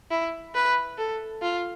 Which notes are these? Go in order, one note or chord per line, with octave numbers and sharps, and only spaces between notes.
E4
B4
A4
F4